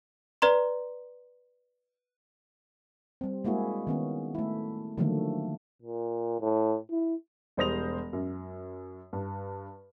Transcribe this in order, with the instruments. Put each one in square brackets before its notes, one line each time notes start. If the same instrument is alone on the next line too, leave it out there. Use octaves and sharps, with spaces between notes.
[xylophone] B4 D5 A#5 C6
[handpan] G3 C4
G#3 A#3 E4 F#4 G#4
D#3 B3 C#4
A3 E4
D3 D#3 F3 F#3 A3 A#3
[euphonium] A#2
A2
E4
[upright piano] E1 G3 C5 D#6 A#6 F7
F#2
G2